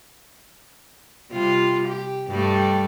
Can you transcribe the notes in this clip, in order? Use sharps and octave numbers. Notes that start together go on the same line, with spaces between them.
C3 G3 F4
G4
G2 G3 A3